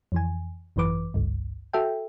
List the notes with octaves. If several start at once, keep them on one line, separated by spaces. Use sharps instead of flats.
F2 E3 G#5
G#1 F#2 E3 B4 D6
G#1 C#2 G2
F#4 A4 E5 G5